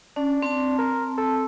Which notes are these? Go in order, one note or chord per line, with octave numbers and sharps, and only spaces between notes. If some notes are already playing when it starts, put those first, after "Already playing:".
C#4 D4
C4 A5
A#4
A4